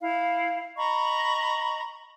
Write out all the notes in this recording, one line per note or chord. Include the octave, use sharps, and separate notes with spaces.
E4 F5
D#5 A#5 B5 C#6